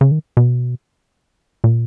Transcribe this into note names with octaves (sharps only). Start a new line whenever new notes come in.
C#3
D#3
B2
A#2